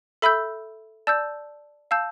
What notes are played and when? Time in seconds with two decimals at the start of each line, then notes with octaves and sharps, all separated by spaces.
0.22 A4 E5 B5 E6 G6
1.07 D5 A5 E6 G6
1.91 F5 A5 E6 G6